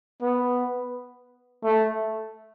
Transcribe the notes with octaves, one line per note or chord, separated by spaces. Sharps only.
B3
A3